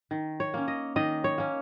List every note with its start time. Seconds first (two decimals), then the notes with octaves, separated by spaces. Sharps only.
0.11 D#3
0.40 C#5
0.54 A#3 C#4
0.68 D#5
0.96 D#3 D#5
1.24 C#5
1.38 A#3 C#4